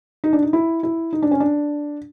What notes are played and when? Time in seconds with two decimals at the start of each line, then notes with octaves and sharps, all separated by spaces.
0.24 D#4
0.33 D4
0.42 D#4
0.53 E4
0.83 E4
1.13 D#4
1.22 D4
1.31 C#4
1.40 D4